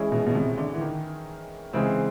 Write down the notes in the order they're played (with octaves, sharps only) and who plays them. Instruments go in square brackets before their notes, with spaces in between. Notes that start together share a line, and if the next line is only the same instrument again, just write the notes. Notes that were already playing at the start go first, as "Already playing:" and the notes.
Already playing: [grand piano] E3 G#3 C#4 E4 G#4
[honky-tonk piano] B2
B2
C3
D3
E3
D#3
[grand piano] C#3 E3 G#3 C4